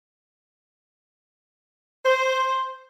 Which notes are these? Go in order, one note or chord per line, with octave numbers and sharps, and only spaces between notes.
C5